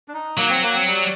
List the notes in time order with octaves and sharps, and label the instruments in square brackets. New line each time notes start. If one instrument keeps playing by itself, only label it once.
[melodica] D4
D#4
[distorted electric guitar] F#3 [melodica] A#3
[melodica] C4
A#3
C4
G3